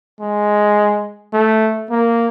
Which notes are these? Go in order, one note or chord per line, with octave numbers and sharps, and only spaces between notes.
G#3
A3
A#3